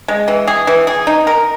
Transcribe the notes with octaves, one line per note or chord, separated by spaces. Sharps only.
G#3
E3
G#4
E3
G#4
D#4
A#4